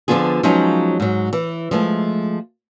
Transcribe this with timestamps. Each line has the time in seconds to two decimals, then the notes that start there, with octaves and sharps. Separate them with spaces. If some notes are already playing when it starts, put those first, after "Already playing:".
0.08 D3 F3 G#3 B3 F4 G#4
0.43 F3 F#3 G#3 C#4 D#4 F4
1.00 G#2 F#3
1.33 E3
1.71 F3 G#3 A3